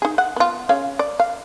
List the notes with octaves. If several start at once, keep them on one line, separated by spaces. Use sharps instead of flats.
D#4 G#4
F#5
B3 F4
C#3 C#5 F5
D5
F5